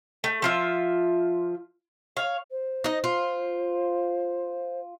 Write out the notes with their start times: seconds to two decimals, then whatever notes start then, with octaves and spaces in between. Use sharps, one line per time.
0.24 A3
0.42 F3 F4 E5
2.17 C#5 F5
2.51 C5
2.84 D#4 D#5
3.04 F4